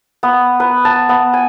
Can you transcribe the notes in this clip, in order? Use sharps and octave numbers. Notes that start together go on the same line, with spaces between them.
B3
B4
A5
B3
G#5